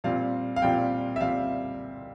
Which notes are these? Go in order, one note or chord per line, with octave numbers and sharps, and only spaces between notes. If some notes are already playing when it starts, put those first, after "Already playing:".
A#2 G3 C4 F5
F5
A#2 G3 C4 G5
E5
A#2 G3 C4 F5